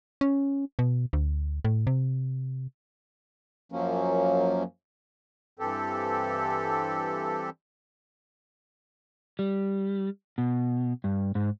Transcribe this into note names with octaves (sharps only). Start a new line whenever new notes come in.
C#4
B2
D2
A2
C3
F#2 F3 F#3 A#3 C#4
G2 E3 C4 G4 A4
G3
B2
G2
G#2